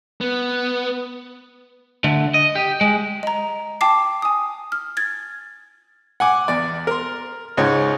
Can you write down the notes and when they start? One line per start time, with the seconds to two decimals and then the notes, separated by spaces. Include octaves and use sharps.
0.21 B3
2.04 D3 A3
2.34 D#5
2.55 G4
2.81 G#3
3.23 D#5 A#5
3.81 G5 A5 D6 C7
4.22 G#5 D#6
4.72 F6
4.97 G#6 A6
6.20 F#5 G#5 D6
6.48 E2 D5
6.87 A#4 C6
7.57 C#2 G#2 C#3 D#4 C#5